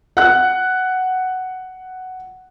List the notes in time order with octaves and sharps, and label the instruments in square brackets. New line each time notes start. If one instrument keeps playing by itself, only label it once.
[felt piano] F#5 F#6